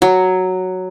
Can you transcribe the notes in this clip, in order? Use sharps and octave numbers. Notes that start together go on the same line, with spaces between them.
F#3